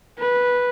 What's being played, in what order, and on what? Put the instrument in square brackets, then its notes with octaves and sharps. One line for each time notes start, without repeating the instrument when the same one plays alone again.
[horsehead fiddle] B4